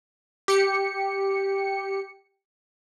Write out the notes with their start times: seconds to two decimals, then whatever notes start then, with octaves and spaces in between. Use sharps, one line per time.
0.48 G4 C#7